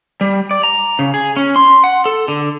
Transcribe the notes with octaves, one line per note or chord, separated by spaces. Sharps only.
G3
D5
A#5
C#3
G#4
C#4
C6
F#5
A4
D3